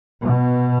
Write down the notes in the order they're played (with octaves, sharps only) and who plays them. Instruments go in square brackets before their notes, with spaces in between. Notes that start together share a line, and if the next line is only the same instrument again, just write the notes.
[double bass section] B2